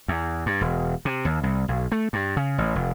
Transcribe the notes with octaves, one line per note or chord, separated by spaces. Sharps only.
E2
G2
E1
C3
D#2
C2
B1
A3
G2
C#3
A1
F1